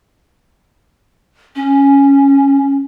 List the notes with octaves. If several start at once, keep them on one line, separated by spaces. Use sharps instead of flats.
C#4